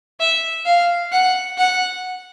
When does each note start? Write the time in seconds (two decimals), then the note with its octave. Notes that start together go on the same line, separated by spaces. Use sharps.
0.20 E5
0.66 F5
1.12 F#5
1.58 F#5